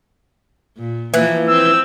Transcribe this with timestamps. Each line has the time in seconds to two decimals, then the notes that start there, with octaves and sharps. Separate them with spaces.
0.77 A#2
1.14 E3 F3 A#3
1.48 C4 E6